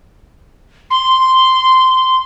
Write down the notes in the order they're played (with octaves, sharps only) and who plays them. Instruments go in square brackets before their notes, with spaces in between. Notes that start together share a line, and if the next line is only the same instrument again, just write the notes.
[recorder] C6